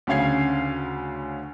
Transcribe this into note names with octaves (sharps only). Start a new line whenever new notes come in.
D2 C#3 C#4 F5 G#6 C7